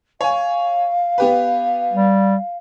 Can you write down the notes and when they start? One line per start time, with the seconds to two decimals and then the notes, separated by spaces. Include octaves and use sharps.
0.21 C#5 F5 G#5
1.18 B3 G4 B4
1.93 G3